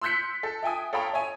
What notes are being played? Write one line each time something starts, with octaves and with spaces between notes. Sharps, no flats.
C6 E6 F#6 G6 B6 C#7
A4
E5 G5 G#5 D#6
A4 C#5 F5 G5 A#5 B5
C#5 E5 G#5